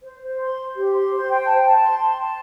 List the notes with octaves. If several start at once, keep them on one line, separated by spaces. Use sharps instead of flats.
C5
C5
C6
C5
G4
C6
C5
G5
A5
A5
C6
A5
A5